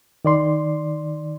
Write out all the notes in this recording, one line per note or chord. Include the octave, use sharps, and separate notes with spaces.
D#3 D5 C6